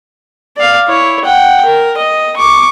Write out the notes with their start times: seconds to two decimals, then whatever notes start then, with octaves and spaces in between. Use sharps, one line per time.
0.57 D5 F5
0.88 E4 C#5
1.25 F#5 G5
1.65 A#4
1.97 D#5
2.37 C#6 D6